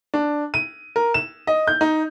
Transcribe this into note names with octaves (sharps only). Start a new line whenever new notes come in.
D4
D#7
A#4
E7
D#5
G6
D#4